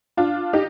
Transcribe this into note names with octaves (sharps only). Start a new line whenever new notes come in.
D4 F4
D#4 G4